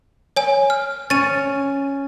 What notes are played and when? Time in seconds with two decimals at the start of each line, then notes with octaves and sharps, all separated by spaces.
0.37 C#5 G#5
0.70 F6
1.10 C#4 A6 D#7